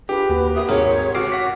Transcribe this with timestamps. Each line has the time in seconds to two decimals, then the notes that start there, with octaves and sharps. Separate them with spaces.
0.09 D4 F4 G4 G#4 B4
0.30 D#2 A#3 F#4
0.55 F#4 A#4 E5 D#6
0.69 C2 G#2 F#4 G#4 A#4 C#5
1.15 C#2 F#4 C#5 D6 F6 C7
1.32 F#5 B6